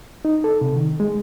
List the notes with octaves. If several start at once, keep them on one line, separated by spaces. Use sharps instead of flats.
D#4
A4
C3
D#3
G#3